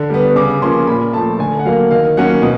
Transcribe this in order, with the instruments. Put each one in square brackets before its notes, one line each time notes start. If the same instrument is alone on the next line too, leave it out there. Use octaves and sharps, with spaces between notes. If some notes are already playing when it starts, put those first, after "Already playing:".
Already playing: [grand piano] D3
G3 B3
C#3 D6
F3 A#3 C#4 C6
A#2 B5
F3 A3 A5
D3 G#5
F#5
F#3 A#3 F5
D#3 F5
F#3 A#3 C#4 F#5
B2